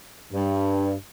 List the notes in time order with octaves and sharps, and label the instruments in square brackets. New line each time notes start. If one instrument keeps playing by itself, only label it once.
[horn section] G2